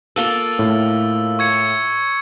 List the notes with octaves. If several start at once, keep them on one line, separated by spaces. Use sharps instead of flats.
A#3 F4 A4 E6 G7
A2
C#6 G#6 C#7